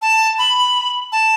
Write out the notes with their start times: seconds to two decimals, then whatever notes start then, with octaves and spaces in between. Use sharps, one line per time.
0.02 A5
0.38 B5
1.12 A5